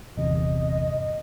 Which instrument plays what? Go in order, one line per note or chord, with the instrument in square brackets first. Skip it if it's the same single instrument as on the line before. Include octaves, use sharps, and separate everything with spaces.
[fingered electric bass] G1 E2 C3 [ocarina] D#5